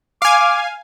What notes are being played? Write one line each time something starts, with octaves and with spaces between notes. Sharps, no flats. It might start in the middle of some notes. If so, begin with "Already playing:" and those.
F5 G#5 D6